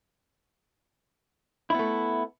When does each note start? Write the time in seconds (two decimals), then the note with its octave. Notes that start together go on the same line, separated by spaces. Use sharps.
1.70 E4
1.75 B3
1.79 A3